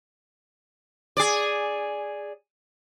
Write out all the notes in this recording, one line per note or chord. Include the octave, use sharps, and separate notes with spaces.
G#4 D5